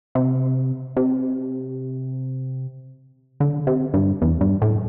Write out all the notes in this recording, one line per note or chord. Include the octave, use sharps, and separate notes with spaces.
C3
C3
D3
C3
G2
E2
G2
A2